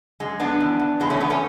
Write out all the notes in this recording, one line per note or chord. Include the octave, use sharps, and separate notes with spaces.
F#2 G#3
F#2 B3 D4
E2
E2
E2 G#3 B3
A3 C#4
E2 B3 D4
A3 C#4